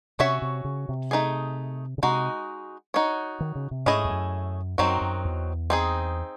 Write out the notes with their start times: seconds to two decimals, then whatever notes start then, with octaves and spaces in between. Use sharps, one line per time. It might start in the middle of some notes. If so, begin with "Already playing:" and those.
0.19 C3 C#4 F#4 C#5 E5
0.42 C3
0.65 C#3
0.89 C3
1.11 A3 D#4 G#4
1.98 C#3
2.03 C3 G#3 D#4 F#4
2.94 D#4 F#4 C#5
3.40 D#3
3.55 C#3
3.71 C3
3.86 G#2 A3 C#4 E4 G#4 D#5
4.05 E2
4.09 F#2
4.78 F#2 D#3 F#3 C4 D#4 F#4
5.01 F#2
5.25 E2
5.70 C4 D#4 G#4